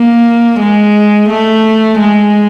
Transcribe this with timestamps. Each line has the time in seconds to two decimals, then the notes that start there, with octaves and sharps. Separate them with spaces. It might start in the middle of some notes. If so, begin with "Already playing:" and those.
Already playing: A#3
0.60 G#3
1.29 A3
1.99 G#3